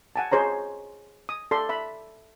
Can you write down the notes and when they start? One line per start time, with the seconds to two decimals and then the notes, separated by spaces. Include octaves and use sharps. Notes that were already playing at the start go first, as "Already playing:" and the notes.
0.16 F#5 G#5 A5
0.32 G#4 C5 C#5 A#5
1.29 D#6
1.51 A4 D5 C6
1.69 E5 B5